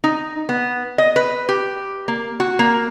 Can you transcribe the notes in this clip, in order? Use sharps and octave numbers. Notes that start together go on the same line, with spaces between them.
D#4
B3
D#5
B4
G4
A#3
F#4
A#3